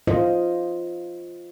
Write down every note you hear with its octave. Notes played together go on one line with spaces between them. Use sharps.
F4 C5 D#5